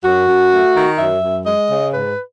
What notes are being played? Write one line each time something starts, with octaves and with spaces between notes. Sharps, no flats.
F#2 F#4
F#2
A3
D#3
F#2 E5
F#2
G#3 D#5
C#3
G#2 B4